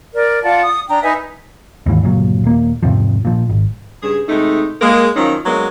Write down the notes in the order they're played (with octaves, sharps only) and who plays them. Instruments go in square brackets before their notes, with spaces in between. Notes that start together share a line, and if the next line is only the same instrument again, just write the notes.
[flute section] A#4 D5
F4 D5 F#5 A5
D#6
D4 G5 A#5
D#4 B4 E5 G#5
[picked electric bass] D#2 G#2 E3
G1 C#2 A#2 F#3
D#1 A#3
E2 G#2 C3 F3
A#2 F3
G#1
[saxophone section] G2 C#3 G#4
C3 G#3 A3 D#4
G#3 A#3
D#3 F3 F#3 C#4 D#4
F#3 G#3 A#3 B3 D4